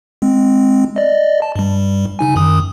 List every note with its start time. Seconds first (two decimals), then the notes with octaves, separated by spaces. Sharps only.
0.22 G#3 C4
0.96 D5 D#5
1.42 A5
1.56 G2 G3
2.19 C#3 D#4 G#5
2.36 F#2 D#3 D#6